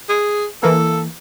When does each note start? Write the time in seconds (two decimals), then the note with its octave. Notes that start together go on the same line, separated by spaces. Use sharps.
0.09 G#4
0.63 E3 A#3 A4